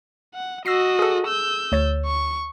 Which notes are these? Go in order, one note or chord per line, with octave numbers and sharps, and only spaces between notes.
F#5
F#4 D#5 E6 A#6 C7
G#4 A4
E6 G6
D2 C#5 A6
C#6